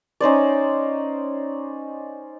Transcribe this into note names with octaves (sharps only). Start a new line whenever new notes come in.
C#4 D#4 C5 D5